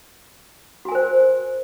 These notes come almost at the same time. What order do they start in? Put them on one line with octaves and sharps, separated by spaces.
F#4 G#5 A#4 C5